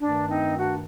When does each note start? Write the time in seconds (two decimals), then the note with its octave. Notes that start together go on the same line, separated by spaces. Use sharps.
0.02 G2 D#3 A3 D4
0.30 C4 D#4
0.59 D4 F#4